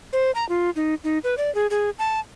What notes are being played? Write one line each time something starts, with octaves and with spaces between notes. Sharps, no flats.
C5
A#5
F4
D#4
D#4
B4
D5
G#4
G#4
A5